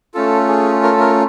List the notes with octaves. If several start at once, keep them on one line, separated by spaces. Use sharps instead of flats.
A3 C#4 F4 A4
G#4
A#4
A4
A#4